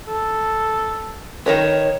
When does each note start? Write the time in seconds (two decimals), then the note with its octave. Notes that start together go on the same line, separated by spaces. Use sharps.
0.07 A4
1.46 D#3 A#4 B4 C#5